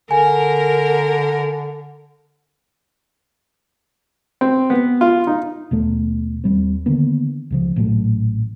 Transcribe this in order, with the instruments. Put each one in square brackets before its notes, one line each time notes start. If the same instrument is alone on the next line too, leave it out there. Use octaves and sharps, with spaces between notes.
[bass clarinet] D3 [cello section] A#4 [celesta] G#5
[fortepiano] C4
B3
F4
D#4
[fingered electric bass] D#2 B2 A3
D#2 G3 C4
D3 D#3 A#3 B3
C#2 C#3 F3
A1 A#2 F#3 A3